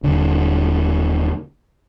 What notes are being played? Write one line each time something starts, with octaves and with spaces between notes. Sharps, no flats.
D#1 D3